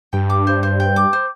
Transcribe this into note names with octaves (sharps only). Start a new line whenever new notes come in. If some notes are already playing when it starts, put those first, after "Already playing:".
G2 G5
D6
C5
C5
G5
D6
C5